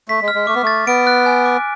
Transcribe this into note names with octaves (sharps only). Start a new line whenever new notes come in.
A3 B6
G#3
F6
G#3
A3 D6
B3
A3 A6
B3 D7
F#6
G#5
D6